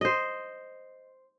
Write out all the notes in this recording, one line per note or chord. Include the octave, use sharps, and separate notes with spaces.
C5 D#5